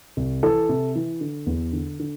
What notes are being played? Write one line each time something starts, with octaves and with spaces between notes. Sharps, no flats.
C2
E3 A4
C3
E3
D3
E2
D3
D3